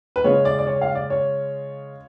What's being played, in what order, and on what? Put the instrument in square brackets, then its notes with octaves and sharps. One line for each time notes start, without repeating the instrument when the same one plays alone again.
[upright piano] B4
C#3 G#3 C#4 F4 C#5
D5
D5
C#5
F5
D5
C#5